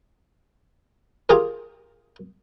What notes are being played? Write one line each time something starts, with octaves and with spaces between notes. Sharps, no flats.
F4 G4 G#4 A#4